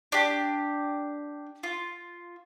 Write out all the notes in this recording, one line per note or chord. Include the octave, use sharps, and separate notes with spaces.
D4 G4
F4